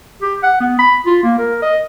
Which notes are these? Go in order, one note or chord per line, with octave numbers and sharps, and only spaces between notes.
G4
F#5
B3
B5
F4
A#3
A#4
D#5